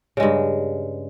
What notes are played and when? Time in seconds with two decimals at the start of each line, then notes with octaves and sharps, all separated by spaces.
0.17 C#3
0.20 G#3
0.23 G2